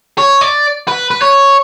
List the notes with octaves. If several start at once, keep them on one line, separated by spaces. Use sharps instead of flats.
C#5
D5
B4
B4
C#5